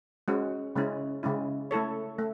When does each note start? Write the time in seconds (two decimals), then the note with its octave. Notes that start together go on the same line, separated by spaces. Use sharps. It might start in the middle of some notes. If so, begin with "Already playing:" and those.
0.28 G#3 C#4 F#4
0.76 C#3 G#3 C#4 E4
1.23 C#3 G#3 C#4 E4
1.71 A3 E4 A4 C#5
2.19 A3